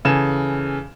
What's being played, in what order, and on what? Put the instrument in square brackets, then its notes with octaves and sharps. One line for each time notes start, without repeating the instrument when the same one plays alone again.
[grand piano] C#3 E3 A4 G#5 E7